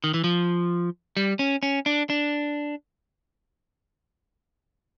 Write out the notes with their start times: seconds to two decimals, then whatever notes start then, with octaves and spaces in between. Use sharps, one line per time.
0.04 D#3
0.14 E3
0.24 F3
1.17 G3
1.39 C#4
1.63 C#4
1.86 D4
2.10 D4